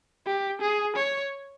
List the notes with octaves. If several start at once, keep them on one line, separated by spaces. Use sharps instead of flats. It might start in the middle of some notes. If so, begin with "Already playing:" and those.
G4
G#4
C#5